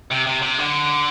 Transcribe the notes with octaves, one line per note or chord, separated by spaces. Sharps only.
C3
C3
C3
D3